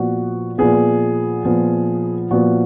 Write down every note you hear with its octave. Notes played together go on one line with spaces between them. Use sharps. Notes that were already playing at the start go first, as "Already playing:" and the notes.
Already playing: A#2 F3 B3 F#4
A#2 F3 B3 G#4
A#2 F3 B3
A#2 F3 B3 F#4